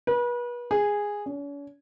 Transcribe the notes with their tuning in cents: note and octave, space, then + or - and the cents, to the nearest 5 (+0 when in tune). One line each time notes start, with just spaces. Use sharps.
B4 -35
G#4 -10
C#4 +45